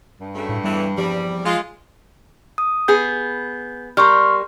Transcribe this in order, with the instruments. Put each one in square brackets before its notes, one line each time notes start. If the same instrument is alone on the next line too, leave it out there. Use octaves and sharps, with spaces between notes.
[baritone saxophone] G2
[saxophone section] F#2 C#3 A3
[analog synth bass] A2
[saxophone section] E2 A2 E3 [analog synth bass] G3
[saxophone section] E2 C3 G3 [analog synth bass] F3
[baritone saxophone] G#3 [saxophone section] F4
[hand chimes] D#6
[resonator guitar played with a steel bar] B3 G#4 [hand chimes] G6
[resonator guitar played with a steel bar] G3 A#4 [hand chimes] C6 C#6 F6